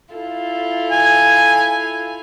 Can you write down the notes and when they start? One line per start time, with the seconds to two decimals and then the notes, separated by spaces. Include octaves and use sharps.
0.14 E4 F4 A4
0.91 G#5